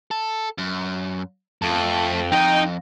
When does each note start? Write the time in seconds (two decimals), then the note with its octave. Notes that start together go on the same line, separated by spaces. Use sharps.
0.11 A4
0.58 F#2
1.62 F2 A3 A4
2.32 F2 D#4 D#5 G5